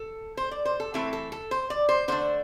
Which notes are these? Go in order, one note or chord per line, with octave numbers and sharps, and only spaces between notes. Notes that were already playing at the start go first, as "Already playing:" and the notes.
Already playing: A4
C5
D5
C5
A4
E3 A3 C4 E4 A4
A4
A4
C5
D5
C5
D3 A3 D4 C5